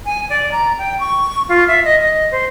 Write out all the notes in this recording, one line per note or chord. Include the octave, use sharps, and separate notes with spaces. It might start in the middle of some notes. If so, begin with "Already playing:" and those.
G#5
D5
A#5
G5
C#6
F4
E5
D#5
D#5
C5